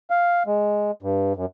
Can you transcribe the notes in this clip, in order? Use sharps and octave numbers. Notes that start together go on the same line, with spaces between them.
F5
G#3
G2
F#2